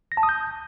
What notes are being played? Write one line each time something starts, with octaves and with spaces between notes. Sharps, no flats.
A#6
A5
D#6
G6